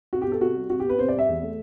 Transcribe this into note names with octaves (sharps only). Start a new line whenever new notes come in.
C3 F#4
G4
B3 A4
C3 F#4
G3
C3 F#4
G4
B3 B4
C3 C5
D5
G3
E5
E2
A3